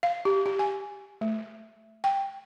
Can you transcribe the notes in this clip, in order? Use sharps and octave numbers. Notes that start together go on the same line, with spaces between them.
F5
G4
G4
G#5
A3
G5